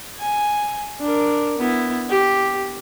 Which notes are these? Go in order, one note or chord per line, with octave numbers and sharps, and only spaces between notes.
G#5
D4 A#4
B3 E4
G4